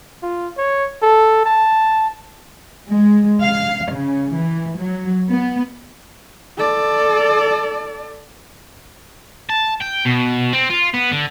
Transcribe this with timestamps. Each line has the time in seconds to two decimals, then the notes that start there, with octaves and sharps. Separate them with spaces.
0.23 F4
0.57 C#5
1.02 A4
1.46 A5
2.90 G#3
3.41 F5
3.91 C#3
4.35 E3
4.78 F#3
5.29 B3
6.57 A4 D5
9.50 A5
9.82 G5
10.06 B2
10.53 C4
10.70 F4
10.94 B3
11.11 D3